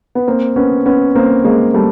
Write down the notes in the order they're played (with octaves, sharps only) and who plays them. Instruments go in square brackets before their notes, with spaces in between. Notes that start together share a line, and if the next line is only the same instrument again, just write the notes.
[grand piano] B3
A#3 C4
B3 C#4
B3 C#4
A#3 C4
G#3 A#3
G3 A3